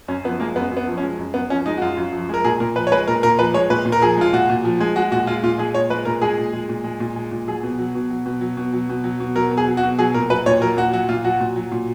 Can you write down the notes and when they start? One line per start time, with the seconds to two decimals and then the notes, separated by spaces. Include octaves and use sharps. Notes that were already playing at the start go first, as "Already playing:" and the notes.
0.08 F#2 C#4
0.24 F3 B3
0.40 G#3 A#3
0.56 F#2 B3
0.72 F#2
0.77 B3
0.88 F3
0.98 C#4
1.03 G#3
1.18 F#2
1.34 F#2 B3
1.50 F3 C#4
1.66 G#3 D#4
1.78 F#4
1.82 F#2 F4
1.97 F#2
2.13 F3
2.29 G#3 A#4
2.44 A#2 G#4
2.60 A#2 A#4
2.76 F3 B4
2.87 C#5
2.92 G#3 B4
3.08 A#2 A#4
3.23 A#2 A#4
3.39 F3 B4
3.54 G#3 C#5
3.70 A#2 B4
3.85 A#2
3.92 A#4
4.02 F3 G#4
4.17 G#3 F4
4.33 A#2 F#4
4.49 A#2
4.65 F3
4.80 G#3
4.96 G#3 F#4
5.11 A#2 F#4
5.27 G#3 F4
5.43 A#2 F4
5.58 G#3 G#4
5.74 A#2 C#5
5.90 G#3 B4
6.05 A#2 A#4
6.22 G#3 G#4
6.38 A#2
6.53 G#3
6.69 A#2
6.84 G#3
7.00 A#2
7.16 G#3
7.31 A#2
7.47 F#3 G#4
7.63 B2
7.79 F#3
7.95 B2
8.10 F#3
8.26 B2
8.41 F#3
8.57 B2
8.73 F#3
8.89 B2
9.04 F#3
9.20 B2
9.35 F#3 A#4
9.51 B2
9.57 G#4
9.68 F#3
9.77 F#4
9.83 B2
9.99 F#3 G#4
10.14 A#2 A#4
10.30 F#3 B4
10.46 A#2 C#5
10.62 F#3 A#4
10.77 A#2 F#4
10.93 F#3 F#4
11.09 A#2 F4
11.24 F#3 F#4
11.40 A#2
11.56 F#3
11.72 A#2